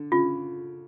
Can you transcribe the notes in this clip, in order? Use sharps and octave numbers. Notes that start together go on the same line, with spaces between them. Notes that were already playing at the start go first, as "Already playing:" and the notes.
Already playing: D3
C#3 F4